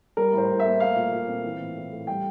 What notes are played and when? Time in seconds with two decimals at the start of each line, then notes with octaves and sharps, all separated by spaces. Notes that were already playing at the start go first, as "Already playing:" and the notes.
0.17 G3 A#4
0.33 A2
0.38 C5
0.50 A2
0.60 E5
0.66 A#3
0.80 A3 F5
0.96 A#2
1.12 A#2
1.28 C4
1.44 E3
1.61 A2
1.77 A2
1.92 A3
2.07 G3 G5